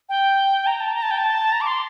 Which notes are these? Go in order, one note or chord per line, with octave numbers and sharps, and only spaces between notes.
G5
A#5
A5
A#5
A5
G5
A5
A#5
D6
C6